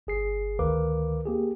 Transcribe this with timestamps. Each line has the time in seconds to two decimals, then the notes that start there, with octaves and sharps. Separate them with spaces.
0.07 G1 G#4 C7
0.59 D2 D#3 A#4 B4 F5 D6
1.26 A#3 G4 G#4